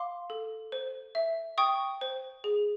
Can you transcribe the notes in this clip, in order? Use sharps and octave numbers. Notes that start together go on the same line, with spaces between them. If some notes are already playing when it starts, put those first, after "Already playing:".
Already playing: F5 C6 D6
A4
C5
E5
G5 C#6 D#6
C5
G#4